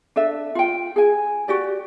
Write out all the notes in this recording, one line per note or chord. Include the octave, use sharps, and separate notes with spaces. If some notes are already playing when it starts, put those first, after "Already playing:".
D4 A4 E5
F4 G5
G#4 G#5
F#4 G4 D5